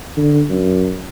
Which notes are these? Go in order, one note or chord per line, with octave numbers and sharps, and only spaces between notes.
D3
F#2